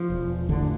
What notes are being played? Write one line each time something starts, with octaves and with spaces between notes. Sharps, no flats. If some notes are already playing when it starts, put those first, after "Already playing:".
Already playing: F3
E1
A1 D3